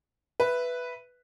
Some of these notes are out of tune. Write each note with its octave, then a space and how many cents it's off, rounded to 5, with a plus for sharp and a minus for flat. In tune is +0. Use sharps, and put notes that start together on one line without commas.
B4 +0 E5 +10